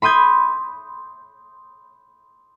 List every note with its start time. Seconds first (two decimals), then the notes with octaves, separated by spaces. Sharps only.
0.02 B5 C6 D#6 G6 G#6